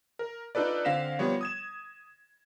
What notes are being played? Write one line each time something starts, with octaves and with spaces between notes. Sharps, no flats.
A#4
D4 D#4 F4 A4 B4 D5
D3 C4 F5 A#6 B6 E7
F3 G3 B3 C#5
D#6 G#6 E7